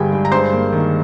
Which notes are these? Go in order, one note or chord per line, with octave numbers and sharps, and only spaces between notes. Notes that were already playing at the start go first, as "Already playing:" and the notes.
Already playing: G1 G2 D3 G4 G#4 G5 G#5
G#3
A#5
G2 C5 C6
A#3
D#3